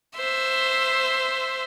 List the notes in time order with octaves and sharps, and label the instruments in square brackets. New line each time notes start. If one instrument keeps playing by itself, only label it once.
[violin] C5 E5